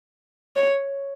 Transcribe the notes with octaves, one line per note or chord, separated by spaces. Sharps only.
C#5